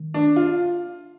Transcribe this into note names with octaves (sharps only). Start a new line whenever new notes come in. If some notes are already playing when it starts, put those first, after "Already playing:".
Already playing: D#3
D4
F4